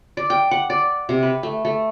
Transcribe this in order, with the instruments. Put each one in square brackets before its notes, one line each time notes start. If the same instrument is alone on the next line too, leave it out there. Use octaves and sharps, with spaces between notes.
[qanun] D5
G5
F#5
D5
C3
B4
A3
A3